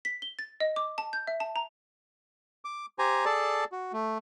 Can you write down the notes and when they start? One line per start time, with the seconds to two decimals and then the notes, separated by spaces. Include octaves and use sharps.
0.05 B6
0.22 G7
0.39 A6
0.60 D#5
0.76 D6
0.98 A5
1.13 G6
1.27 E5
1.40 A5
1.56 A#5
2.65 D6
2.99 G4 C5 G#5 A#5
3.25 G#4 A4 D5 A5
3.72 F#4
3.93 A3